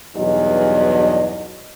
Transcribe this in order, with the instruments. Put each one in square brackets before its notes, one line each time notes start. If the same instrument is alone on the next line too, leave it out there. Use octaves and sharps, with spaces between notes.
[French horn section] E2 G2 B2 F#3 D#4 D#5